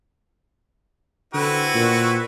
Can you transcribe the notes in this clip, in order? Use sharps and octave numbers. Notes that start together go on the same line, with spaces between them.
D3 C4 E4 F#4 B4
A#2